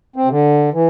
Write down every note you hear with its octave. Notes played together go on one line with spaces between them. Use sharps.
C4
C3
D3
E3